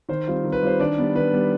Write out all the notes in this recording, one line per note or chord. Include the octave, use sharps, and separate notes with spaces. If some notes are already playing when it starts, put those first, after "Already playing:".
D#3 C5
G3 C4 F4
D#3
B4
G3 C4 F4 C5
D#3 D4 D5
G3 B3
D#3 B4
G3 B3